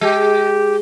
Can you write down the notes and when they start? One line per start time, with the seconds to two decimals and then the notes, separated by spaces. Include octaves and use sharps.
0.01 G#3 G4